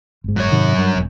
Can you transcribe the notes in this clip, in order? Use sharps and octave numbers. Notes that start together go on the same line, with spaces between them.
G1 G#2
F#2 C#5
G#2 C3 D#3
G2
E1